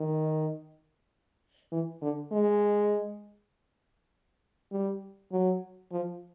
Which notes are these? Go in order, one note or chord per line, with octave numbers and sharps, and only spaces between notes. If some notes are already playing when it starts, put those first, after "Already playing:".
Already playing: D#3
E3
D3
G#3
G3
F#3
F3